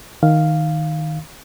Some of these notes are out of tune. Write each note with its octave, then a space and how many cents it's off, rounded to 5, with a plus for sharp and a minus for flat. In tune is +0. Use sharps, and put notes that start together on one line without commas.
D#3 +0 F5 +0